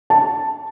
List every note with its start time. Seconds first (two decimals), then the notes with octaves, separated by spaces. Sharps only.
0.10 A5